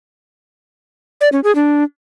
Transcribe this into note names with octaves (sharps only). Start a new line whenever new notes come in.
D5
C#4
G#4
D4